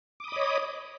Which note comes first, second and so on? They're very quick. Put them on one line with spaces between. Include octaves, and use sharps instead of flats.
D6 D#6 B5 D#5 C#5